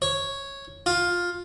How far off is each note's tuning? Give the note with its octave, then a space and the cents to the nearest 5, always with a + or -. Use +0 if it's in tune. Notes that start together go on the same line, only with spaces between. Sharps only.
C#5 -5
F4 +10